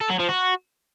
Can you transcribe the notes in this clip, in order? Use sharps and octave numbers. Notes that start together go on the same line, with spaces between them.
A4
F#3
F3
F#4